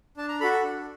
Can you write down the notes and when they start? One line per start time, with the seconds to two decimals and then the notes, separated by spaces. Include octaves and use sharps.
0.17 D4 A5
0.29 A#5
0.40 F#4 A4 B5
0.63 D4